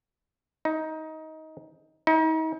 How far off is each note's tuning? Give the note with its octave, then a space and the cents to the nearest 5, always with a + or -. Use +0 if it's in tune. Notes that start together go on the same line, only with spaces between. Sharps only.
D#4 +20
D#4 +40